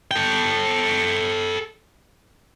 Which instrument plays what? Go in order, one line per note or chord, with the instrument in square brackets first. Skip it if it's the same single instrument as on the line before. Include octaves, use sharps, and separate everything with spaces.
[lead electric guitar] A4 G5